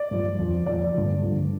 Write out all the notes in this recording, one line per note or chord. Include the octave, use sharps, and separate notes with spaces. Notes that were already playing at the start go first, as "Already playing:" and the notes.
Already playing: D5
G2 F3
F2 F3
F2 F3 D5
G2 D3 F3
G2 D3 F3